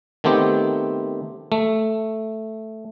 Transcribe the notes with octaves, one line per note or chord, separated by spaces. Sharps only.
D#3 A3 B3 C4 G4
A3